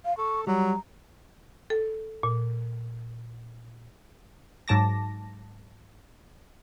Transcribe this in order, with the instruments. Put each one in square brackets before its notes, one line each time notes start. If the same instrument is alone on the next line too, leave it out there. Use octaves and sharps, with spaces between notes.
[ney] F5
[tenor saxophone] A4 [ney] C#6
[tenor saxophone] F#3 [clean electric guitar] G3 [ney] A#5
[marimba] A4
A#2
[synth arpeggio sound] G#2 F#3 A5 D6 A#6